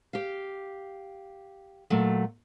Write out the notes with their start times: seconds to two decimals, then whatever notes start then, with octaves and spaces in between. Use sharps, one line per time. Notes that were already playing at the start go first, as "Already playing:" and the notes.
0.13 G4 F5
1.90 A#2 F#3 A3